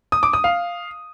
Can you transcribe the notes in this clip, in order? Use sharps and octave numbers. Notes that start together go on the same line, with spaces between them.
D#6
D6
D#6
F5